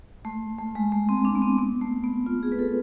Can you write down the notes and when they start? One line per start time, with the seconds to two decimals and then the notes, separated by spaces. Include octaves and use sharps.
0.25 A3
0.59 A3
0.75 G#3
0.92 A3
1.09 C4
1.25 D4
1.35 B3
1.42 C4
1.58 B3
1.81 A3
2.04 B3
2.26 F4
2.43 G#4
2.52 B4
2.59 A4